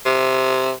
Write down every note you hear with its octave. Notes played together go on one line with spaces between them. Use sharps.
C3